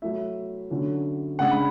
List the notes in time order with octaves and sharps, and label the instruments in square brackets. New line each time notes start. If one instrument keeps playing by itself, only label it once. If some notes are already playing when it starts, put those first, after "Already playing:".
[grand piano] F#3 A3 E4 E5
D3 F#3 C#4 E4
C#3 G#3 D4 F#5
B5